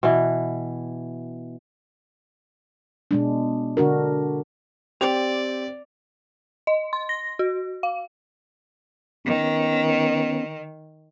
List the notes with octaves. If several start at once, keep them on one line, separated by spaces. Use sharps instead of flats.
B2 E3
B2 G#3 D4
D3 D4 F#4 A#4
C4 G4 D5 F7
D#5
C6
A#6
F#4
F5
D#3 B3 C#4